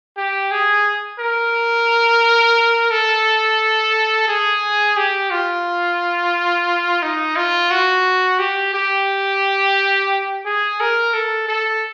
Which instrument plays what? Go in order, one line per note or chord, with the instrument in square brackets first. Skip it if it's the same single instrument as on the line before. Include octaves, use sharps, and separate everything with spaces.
[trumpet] G4
G#4
A#4
A4
G#4
G4
F4
D#4
F4
F#4
G4
G4
G#4
A#4
A4
A4